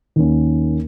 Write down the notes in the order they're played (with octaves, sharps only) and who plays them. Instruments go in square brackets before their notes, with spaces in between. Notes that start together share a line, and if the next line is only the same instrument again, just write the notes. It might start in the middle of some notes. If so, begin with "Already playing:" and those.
[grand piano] D#2 D#3 A#3 C#4